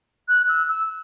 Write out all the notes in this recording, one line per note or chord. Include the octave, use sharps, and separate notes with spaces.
F#6
E6
E6